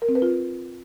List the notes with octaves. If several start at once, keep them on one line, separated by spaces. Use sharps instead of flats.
A#4
C4
B4
F4